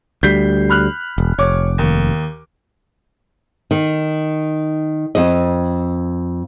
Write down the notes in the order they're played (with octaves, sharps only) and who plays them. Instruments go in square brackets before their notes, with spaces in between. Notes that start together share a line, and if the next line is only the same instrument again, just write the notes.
[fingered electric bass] D2 G3 [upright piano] G6 B6 C7
[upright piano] B5 F6 F#6
[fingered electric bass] E1
[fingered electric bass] F1 [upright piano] C#5 D6
[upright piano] D#2
[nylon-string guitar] D#3
F2 D#5